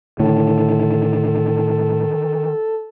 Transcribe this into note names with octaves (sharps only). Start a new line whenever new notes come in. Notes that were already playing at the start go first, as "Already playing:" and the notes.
A2 D3 D#3 A4